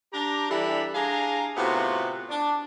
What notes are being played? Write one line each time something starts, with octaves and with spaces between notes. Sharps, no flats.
D4 G4 A#5
E3 G3 D4 A4 E5 B5
D4 G#4 F5 G#5 A#5
A2 C3 B3 F4 F#4
D4